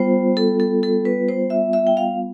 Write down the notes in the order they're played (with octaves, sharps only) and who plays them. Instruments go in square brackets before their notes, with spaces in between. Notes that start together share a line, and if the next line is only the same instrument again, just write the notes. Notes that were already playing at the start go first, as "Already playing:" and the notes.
Already playing: [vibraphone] G3 B3 F4 C5
A4
A4
A4
B4
C5
E5
E5
G5
F5